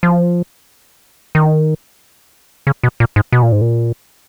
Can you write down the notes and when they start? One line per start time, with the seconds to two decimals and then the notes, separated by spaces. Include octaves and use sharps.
0.03 F3
1.35 D#3
2.67 C#3
2.83 B2
3.00 A#2
3.16 G#2
3.32 B2
3.43 A#2
3.52 G#2
3.61 A#2